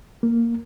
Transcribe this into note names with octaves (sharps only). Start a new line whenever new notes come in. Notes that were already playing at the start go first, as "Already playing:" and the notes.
A#3